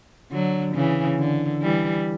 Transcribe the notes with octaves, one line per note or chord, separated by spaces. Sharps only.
D3 F#3
C#3 E3
D3
E3 G3